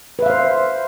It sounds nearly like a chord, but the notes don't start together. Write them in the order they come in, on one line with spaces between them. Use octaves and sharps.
B4 E5 F5 C5